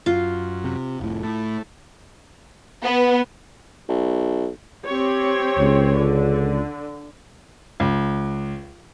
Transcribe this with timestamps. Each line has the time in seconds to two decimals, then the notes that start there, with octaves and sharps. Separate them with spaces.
0.06 F#2 F4
0.64 C3
1.00 F1 A2
1.23 A2 A3
2.82 B3
3.89 B1
4.86 C4 G4 C#5
5.58 C#2
5.96 D3
7.80 C#2